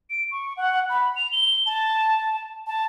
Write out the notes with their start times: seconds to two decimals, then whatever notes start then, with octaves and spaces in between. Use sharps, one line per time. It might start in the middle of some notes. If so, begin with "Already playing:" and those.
0.10 D7
0.31 C#6
0.57 F#5
0.89 B5
1.16 F7
1.32 G7
1.66 A5
2.67 A5